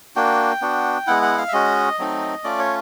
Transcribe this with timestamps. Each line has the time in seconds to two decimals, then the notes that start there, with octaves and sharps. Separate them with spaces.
0.16 A#3 D4 F#4 G5
0.62 B3 D4 F#4
1.07 G#3 B3 E4 F#5
1.22 F#5
1.37 F5
1.48 E5
1.52 G#3 C#4 F#4 D#5
1.98 F#3 A3 C4 D#4
2.44 A3 C#4 F4 D5
2.59 C#5